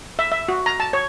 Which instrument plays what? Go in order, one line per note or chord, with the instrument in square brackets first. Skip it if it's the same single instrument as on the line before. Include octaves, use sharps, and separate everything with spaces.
[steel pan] E5
E5
F#4
A#5
A5
C#5